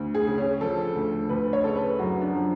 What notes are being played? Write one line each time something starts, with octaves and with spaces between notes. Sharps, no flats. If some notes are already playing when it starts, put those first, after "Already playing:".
Already playing: D2
G#4
C#3
C#4
F3 A4
D2
D2 B4
C#5
C#3 A4
B4
F#2 F#4
D4
F3